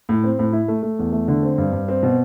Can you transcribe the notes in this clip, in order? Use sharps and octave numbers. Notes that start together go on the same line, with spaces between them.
A2
C4
A2
E4
A3
A3
E2
A3
D3
C4
G2
G2
C4
B2